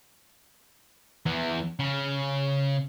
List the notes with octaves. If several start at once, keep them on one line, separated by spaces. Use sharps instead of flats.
E2 E3
C#3